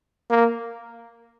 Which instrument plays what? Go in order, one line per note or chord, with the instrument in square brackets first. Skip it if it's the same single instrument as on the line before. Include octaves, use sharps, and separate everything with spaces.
[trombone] A#3